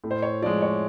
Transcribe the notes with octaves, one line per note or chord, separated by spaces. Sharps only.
A2
C5
C#5
F3 G#3 D5
C#5